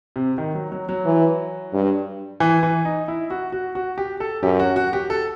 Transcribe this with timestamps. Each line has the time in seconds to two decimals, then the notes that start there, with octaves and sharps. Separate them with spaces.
0.16 C3
0.38 D#3
0.55 F#3
0.72 F#3
0.89 F#3
1.06 E3
1.73 G2
2.40 E3
2.63 E3
2.85 D#4
3.08 E4
3.30 F#4
3.52 F#4
3.75 F#4
3.98 G4
4.20 A4
4.43 F#2 G4
4.59 F#4
4.76 F#4
4.93 G4
5.10 A4